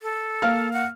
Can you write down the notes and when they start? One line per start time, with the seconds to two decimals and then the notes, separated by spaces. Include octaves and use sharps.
0.02 A4
0.42 A#3 F5 F6
0.73 F#5